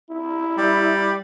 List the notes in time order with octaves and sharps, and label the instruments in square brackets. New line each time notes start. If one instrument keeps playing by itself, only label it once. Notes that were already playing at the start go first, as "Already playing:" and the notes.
[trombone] E4
[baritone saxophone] G3